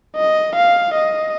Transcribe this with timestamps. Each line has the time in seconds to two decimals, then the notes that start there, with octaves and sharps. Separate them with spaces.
0.16 D#5
0.55 F5
0.94 D#5